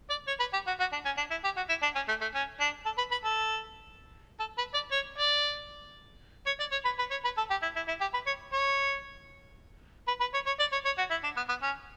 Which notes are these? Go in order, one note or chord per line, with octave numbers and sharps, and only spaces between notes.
D5
C#5
B4
G4
F#4
F#4
D4
C#4
D4
E4
G4
F#4
E4
D4
C#4
A3
A3
C#4
D4
A4
B4
B4
A4
A4
B4
D5
C#5
D5
C#5
D5
C#5
B4
B4
C#5
B4
A4
G4
E4
E4
E4
G4
B4
C#5
C#5
B4
B4
C#5
C#5
D5
C#5
C#5
F#4
E4
D4
B3
B3
C#4